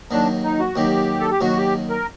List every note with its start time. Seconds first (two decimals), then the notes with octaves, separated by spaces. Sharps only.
0.11 D#2 D#3 F#3 D4
0.44 D#4
0.59 F#4
0.75 D#2 D#3 F#3 G4
1.20 A4
1.31 G4
1.41 D#2 D#3 F#3 F#4
1.57 G4
1.90 A#4